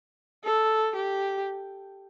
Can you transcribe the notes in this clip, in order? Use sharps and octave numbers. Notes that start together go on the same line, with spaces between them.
A4
G4